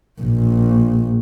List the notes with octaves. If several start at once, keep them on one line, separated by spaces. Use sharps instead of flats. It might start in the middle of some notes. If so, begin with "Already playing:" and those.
A#1